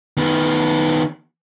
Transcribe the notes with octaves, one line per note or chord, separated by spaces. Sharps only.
D#3 B3